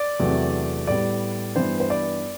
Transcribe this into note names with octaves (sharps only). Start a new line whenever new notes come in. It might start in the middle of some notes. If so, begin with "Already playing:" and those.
Already playing: D5
E2 C3 F#3 A3
A2 G3 B3 D5
G2 E3 G3 B3 C5
C5
D5